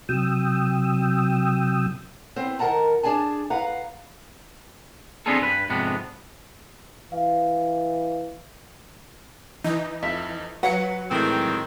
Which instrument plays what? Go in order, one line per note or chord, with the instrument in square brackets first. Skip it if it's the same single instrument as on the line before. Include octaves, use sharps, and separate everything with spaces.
[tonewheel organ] C3 F#3 G5 D#6 E6
[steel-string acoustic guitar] B3 C4 C5
D#3 A#4 F#5 A5 A#5
D4 G#4 G#5 A5
B4 F5 F#5 A#5
[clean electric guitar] B3 C4 D4 F4 G#4 A4
G2 B4
F2 G#2 C3 B3 D4
[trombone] E3 [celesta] F5
[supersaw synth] E3 D#4
[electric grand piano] F2 [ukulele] E5
[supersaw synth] F#3 [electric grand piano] B4 C#7 [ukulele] F#5
[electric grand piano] A2 E3 G#3 [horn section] D#3 C4